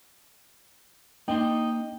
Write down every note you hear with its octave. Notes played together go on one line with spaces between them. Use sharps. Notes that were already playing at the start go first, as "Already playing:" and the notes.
A#3 D4 D#4 G5 C6